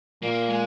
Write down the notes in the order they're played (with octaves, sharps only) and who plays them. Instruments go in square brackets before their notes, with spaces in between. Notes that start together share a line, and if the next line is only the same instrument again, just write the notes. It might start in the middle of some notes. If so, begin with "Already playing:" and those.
[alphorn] A#2 [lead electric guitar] A#3
[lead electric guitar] G#3